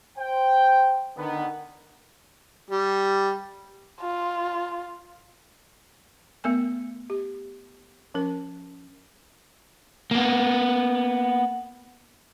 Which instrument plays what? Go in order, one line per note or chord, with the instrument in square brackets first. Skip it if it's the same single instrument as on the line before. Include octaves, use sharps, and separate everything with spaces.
[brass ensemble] C5 G5
D3 D#3 B3
[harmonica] G3
[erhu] F4
[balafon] A3 B3 A#4 G#5
G4
F3 C#4 A#4
[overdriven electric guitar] A#3 B3